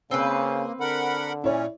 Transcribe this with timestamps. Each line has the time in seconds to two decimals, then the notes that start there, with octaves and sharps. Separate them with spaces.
0.11 C#3 A#3 C4 B4
0.80 D3 A#4 F#5 B5
1.44 A#2 C#4 E4 C#5 D5